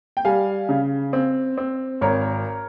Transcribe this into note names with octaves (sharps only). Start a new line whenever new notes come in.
G5
G3 F5 G#5
C#3
C4
C4
G#1 A#4 C#5